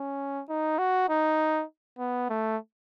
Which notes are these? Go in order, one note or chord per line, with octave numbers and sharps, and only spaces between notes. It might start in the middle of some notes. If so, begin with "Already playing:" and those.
Already playing: C#4
D#4
F#4
D#4
B3
A3